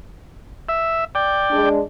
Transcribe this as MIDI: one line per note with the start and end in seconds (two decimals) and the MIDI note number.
0.69 1.04 76
1.15 1.69 74
1.15 1.69 79
1.51 1.80 56
1.51 1.80 62